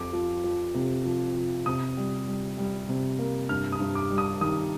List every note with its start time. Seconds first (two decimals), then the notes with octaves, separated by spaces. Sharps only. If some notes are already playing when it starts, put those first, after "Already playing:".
Already playing: F2 D6
0.13 F3
0.44 F3
0.74 C3
1.05 F3
1.36 F3
1.66 C3 D#6
1.97 G3
2.27 G3
2.58 G3
2.89 C3
3.19 A#3
3.49 G2 F6
3.72 D#6
3.80 G2
3.95 D6
4.10 G3
4.18 D#6
4.41 D#3 D#6